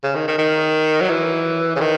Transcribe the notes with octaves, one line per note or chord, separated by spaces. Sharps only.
C#3
D#3
D#3
D#3
F#3
E3
C#3
D#3